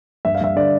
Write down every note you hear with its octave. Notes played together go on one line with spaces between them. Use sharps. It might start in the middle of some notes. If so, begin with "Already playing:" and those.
G2 E5
F5
G2 E5
D3 D5